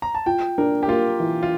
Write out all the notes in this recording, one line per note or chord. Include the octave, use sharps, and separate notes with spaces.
A#5
A5
F4 G5
D4 A#4
G4
A#3 F4
E3
F4